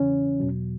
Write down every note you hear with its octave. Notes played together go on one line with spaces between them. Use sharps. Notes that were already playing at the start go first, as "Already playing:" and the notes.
Already playing: E2 C#3 E3 C#4
E2 B2 F#3